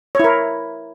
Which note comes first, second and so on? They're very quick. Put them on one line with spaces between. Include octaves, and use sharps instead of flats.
C#5 E4 A#4